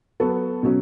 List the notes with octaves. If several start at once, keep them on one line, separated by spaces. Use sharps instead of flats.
F#3 B3 F#4 A4
B2 F#3 C#4